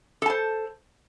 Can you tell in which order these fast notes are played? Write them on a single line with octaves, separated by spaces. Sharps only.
A4 A5 C5